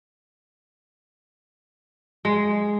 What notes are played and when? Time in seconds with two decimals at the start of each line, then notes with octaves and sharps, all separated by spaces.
2.25 G#3